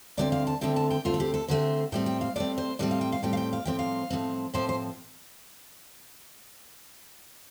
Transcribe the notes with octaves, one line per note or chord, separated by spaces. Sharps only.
D2 D3 A3 C4 D5
F5
A5
D2 D3 A3 C4 G5
A5
G5
D2 D3 A3 C4 F4
A4
G4
A4
D2 D3 A3 C4 C5
A2 G3 C4 G5
G5
F5
A2 G3 C4 D5
C5
A2 G3 C4 D5
F5
G5
F5
A2 G3 C4 G5
F5
G5
F5
A2 F3 C4 G5
F5
A2 F3 C4
A2 F3 C4 C5
C5